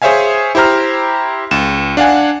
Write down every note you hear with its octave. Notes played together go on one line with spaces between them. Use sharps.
G#4 C5 C#5 E5 F5 G#5
E4 G4 C5 A#5 F6
C#2 E7
D4 F5 F#5 G#5